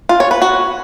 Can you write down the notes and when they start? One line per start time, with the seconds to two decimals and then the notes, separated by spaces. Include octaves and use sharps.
0.09 F4
0.20 C#5
0.31 B4
0.42 F#4